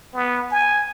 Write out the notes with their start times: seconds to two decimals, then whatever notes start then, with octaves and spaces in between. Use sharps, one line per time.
0.14 B3
0.51 G#5